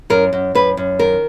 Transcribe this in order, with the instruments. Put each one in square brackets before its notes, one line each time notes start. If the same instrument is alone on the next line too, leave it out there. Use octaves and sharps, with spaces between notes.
[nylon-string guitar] F#2 A#4
F#2
F#2 B4
F#2
D#3 A#4